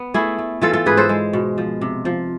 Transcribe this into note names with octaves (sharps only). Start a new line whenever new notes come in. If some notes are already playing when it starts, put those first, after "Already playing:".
Already playing: B3
A3 E4 G#4
A3
E3 F4 A4
F4 A4
G#2 G#4 B4
A4 C5
G#3
B2
F3
C3
F3